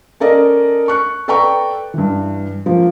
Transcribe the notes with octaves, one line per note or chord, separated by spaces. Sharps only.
C#4 A4 A#4 D5 D#5
C#6 F#6 C#7
A4 B4 D5 G5 A#5 C#6
G2 E3
F3 A#3